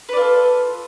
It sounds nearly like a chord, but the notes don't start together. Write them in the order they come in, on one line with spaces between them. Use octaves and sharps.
B4 D5 F4 A4